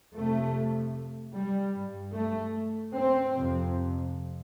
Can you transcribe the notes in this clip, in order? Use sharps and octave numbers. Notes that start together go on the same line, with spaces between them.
F2 C3 A3
G3
G2
A3
C4
F2 C3